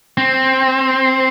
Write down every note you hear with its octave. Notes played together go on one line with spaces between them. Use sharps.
C4